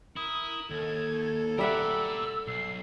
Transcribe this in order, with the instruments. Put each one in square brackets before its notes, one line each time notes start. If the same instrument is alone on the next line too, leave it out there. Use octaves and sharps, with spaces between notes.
[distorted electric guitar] E4 [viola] A#4 [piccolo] D#6
[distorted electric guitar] D#2 [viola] A4 [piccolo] G#6
[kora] G3 E5 F#5 [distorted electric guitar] A#4 D5 [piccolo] E6
[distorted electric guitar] B1 [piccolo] C7